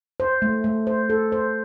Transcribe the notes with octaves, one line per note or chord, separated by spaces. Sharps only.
C5
A3
A3
C5
A4
C5